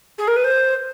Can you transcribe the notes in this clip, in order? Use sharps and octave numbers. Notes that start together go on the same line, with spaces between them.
G#4
A#4
B4
C5